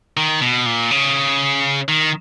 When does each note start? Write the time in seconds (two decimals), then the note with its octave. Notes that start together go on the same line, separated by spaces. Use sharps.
0.17 D#3
0.42 B2
0.66 A#2
0.91 C#3
1.88 D#3